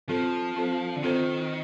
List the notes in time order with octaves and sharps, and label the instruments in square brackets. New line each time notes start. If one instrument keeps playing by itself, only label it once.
[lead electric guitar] F3 [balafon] C4 F4 A4 C5
[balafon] C4 F4 A4 C5
[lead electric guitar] D3
[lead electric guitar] D#3 [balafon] C4 F4 A4 C5